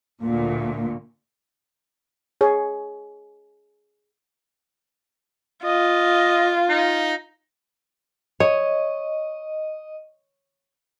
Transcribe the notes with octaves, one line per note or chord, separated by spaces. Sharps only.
D2 A#2
G#4 C#5
F4 D#5
D#4
C#5 D#5